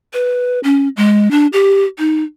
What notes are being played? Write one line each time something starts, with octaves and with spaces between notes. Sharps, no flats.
B4
C#4
G#3
D4
G4
D#4